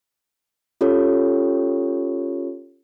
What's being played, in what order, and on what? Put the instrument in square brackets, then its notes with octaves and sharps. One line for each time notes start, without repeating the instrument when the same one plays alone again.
[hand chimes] C#4 F4 G4 A4 C#5